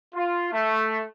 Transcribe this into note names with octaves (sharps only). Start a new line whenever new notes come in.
F4
A3